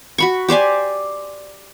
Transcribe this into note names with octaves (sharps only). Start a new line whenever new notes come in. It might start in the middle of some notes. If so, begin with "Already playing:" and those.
F#4 B5 C#6
G4 C5 D5 G#5